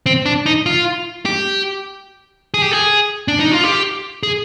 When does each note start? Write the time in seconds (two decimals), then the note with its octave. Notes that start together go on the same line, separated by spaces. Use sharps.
0.06 C4
0.26 D4
0.46 D#4
0.66 F4
1.25 G4
2.54 G#4
2.62 G4
2.71 G#4
3.28 D4
3.40 D#4
3.52 F4
3.64 G4
4.23 G#4